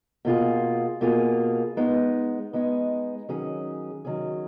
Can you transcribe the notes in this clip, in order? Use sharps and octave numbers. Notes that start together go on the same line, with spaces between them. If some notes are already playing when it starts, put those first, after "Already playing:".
B2 A#3 F4 G#4
B2 A#3 F4 G#4
G#3 B3 D#4
G#3 B3 D#4
D#3 F#3 C#4 G#4
D#3 F#3 C#4 G#4